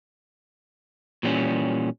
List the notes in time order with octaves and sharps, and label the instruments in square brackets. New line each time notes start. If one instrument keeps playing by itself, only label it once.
[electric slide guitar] A#2 E3 G3 A3 C#4